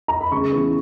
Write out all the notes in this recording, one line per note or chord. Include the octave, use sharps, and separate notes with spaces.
A#5
B5
C#3 C#6
E3 B3